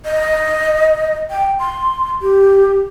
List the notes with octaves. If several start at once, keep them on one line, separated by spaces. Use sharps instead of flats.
D#5
G5
C6
G4